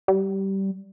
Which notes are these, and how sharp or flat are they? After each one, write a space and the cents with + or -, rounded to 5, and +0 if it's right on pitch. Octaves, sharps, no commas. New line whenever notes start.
G3 -15